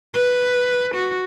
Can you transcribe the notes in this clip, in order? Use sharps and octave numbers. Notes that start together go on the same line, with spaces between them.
B4
F#4